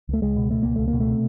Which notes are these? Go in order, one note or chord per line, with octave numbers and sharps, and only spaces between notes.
C#2 A3
C#2 G#3
B2
B2 A3
C#2 A#3
C#2 A3
A#3
B2
A3
C3